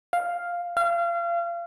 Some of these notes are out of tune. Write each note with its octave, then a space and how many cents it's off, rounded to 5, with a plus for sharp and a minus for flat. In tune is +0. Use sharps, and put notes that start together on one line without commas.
F5 +0
F5 -30